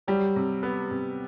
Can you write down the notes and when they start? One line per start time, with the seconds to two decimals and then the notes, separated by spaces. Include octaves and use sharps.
0.07 F#3 G3
0.36 C3
0.63 B3
0.91 C3